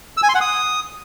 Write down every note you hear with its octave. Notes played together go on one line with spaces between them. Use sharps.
E6
G#5
C6
F#5
D#6